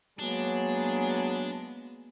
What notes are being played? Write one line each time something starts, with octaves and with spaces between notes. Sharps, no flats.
F#3 G#3 A#3 B3 D4 G#4